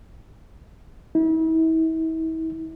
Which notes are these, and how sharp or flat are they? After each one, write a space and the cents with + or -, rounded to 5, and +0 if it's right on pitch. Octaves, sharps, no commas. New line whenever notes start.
E4 -40